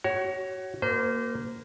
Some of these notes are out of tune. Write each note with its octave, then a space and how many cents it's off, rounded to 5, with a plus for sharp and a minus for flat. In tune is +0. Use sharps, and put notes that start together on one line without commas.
F#4 +30 C#5 +0
A#3 +0 C5 -35